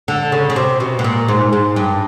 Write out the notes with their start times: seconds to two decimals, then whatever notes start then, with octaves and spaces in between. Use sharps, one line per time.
0.08 D3
0.32 C#3
0.50 C#3
0.56 C3
0.80 B2
0.99 B2
1.04 A#2
1.28 G#2
1.53 G#2
1.76 G2